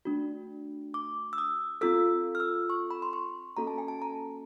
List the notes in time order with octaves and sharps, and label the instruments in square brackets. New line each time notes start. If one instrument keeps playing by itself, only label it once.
[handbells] A3 D4 F#4
D6
E6
D#6
C4 F4 A4 E6
F6
E6
C#6
B5
C6
C#6
A#3 C#4 F#4 A4 A#5
A5
G#5
A5
A#5